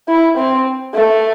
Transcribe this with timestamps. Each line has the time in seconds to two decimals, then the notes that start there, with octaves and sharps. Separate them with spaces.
0.08 E4
0.37 C4
0.94 A3